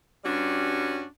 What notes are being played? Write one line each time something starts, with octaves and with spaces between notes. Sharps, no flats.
G2 G3 C#4 D4 F#4